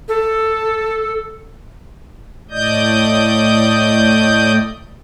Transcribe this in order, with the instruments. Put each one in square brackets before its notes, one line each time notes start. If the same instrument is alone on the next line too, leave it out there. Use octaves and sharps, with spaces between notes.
[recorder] A4
[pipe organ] A2 A3 D5 D#5 D#6 G6